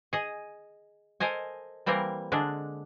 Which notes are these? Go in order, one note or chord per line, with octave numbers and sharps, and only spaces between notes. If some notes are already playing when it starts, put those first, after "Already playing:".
G#4 D#5
A4 A#4 C5 D#5 G#5
E3 G3 A#3 C4 A#4
D3 G#3 D4